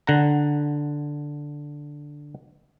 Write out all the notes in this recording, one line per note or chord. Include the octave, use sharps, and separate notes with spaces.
D3 F#5 A#5